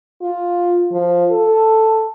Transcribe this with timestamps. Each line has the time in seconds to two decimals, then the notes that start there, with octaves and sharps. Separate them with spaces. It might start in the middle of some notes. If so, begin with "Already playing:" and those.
0.22 F4
0.92 F3
1.31 A4